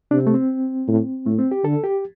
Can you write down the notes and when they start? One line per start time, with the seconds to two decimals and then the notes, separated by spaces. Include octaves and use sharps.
0.11 C3 D4
0.19 C4
0.27 A3
0.34 C4
0.88 A2
1.26 A2 A3
1.39 C4
1.51 G4
1.64 D3 A4
1.84 G4